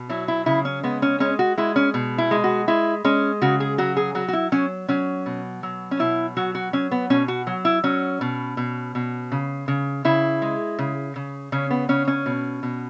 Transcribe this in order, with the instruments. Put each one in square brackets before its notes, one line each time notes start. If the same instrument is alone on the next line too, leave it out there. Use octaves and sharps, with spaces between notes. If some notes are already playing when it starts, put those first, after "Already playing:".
Already playing: [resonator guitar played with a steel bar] B2
F#3 E4
E4
C#3 E4
C#4
G#3 B3
C#4
G#3 C#4
F#4
G#3 E4
C#4
B2
E4
G#3
F#4
G#3 E4
G#3 C#4
C#3 F#4
G#4
F#3 F#4
G#4
F#3 F#4
F#4
E4
F#3 C#4
F#3 C#4
B2
F#3
C#4
B2 E4
F#3 F#4
F#4
F#3 C#4
B3
B2 C#4
F#4
F#3
E4
F#3 C#4
B2
B2
B2
C#3
C#3
C#3 E4
G#3
C#3
C#3
C#3 C#4
B3
C#3 C#4
C#4
B2
B2